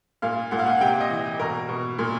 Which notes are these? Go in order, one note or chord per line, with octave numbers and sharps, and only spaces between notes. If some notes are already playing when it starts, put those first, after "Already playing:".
A#2 F5
A#2 F#5
F5
F#5
C3 G5
D#5
E3
B2 A#4
B2
A#2